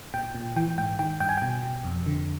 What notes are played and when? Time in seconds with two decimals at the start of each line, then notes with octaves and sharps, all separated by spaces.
0.14 A#2 G5
0.35 A#2
0.56 E3 G5
0.78 G#2 G5
0.99 D#3 G5
1.20 G2 G5
1.29 G#5
1.38 B2 G5
1.63 B2
1.84 F2
2.06 D3